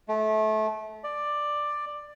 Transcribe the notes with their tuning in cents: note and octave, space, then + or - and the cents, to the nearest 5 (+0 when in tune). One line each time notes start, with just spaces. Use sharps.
A3 -25
D5 +10